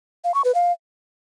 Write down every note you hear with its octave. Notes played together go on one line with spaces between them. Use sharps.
F5
C#6
B4
F5